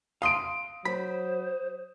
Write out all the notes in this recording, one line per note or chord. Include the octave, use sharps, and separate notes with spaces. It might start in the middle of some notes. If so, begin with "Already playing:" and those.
F5 C6 D#6 D7
F#3 C5 B5